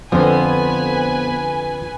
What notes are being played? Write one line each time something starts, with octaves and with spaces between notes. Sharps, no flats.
F2 D3 F3 B3 B4 C5 G#5